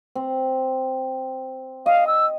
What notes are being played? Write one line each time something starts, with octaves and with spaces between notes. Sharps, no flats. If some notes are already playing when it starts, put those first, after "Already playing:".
C4
D#5 F5
E6